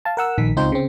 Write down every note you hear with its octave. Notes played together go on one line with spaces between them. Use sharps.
F5 A5
A#4 F#5 E6
A#1 D#3 B6
C#2 C4 D#4 F4 C5 G6
C#3 C4